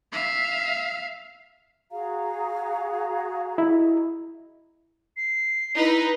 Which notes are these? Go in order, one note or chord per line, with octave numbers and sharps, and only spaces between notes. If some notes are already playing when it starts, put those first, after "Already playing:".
E5 F5
F#4 G#4 F5 A#5
E4 D#5
C7
D#4 E4 B4